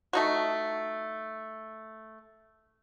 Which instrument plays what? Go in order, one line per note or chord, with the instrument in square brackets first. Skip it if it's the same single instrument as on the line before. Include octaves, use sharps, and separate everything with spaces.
[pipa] A3 D#4 F#4